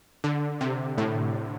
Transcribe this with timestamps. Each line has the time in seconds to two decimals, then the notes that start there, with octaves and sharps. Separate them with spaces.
0.24 D3
0.61 C3
0.98 A2